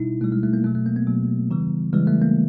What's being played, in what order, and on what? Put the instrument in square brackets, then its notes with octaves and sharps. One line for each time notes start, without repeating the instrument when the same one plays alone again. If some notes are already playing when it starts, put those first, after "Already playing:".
Already playing: [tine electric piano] B2 G3 D#4 E4
B2 G3 A3
G#3
A3
A#3
B2 F#3 A3
A3
A#3
B3
B2 F#3
C#3 E3 G3
C#3 E3 G3 G#3
A3
A#3